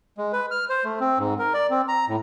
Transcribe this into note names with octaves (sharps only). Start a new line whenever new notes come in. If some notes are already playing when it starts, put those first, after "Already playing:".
G#3
B4
F6
C5
A3
C4
G#2
A#4
D5
C4
A#5
A2